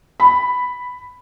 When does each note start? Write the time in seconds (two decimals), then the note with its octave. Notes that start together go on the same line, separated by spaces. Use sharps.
0.20 B5